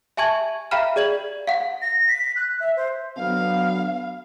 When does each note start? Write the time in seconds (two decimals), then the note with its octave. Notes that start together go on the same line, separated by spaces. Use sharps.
0.17 E5 G#5 A5 C#6 G#6
0.71 E5 F5 G5 A#5 B5 F6
0.96 G#4 D5 G#6 F#7
1.47 F5 F#5
1.82 A#6
2.08 B6
2.36 F#6
2.60 E5
2.76 C5
3.18 D3 F#3 B3 F5